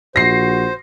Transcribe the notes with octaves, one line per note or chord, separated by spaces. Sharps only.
A#1 F#4 C5 A#6 C7